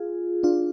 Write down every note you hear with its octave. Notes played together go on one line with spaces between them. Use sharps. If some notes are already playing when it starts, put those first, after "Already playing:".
Already playing: F4 G#4
D4 F4